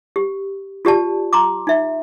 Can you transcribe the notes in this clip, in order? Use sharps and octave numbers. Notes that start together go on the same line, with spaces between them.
G4
F4 G4 D5 A5
A#5 C6 D6
D#4 E5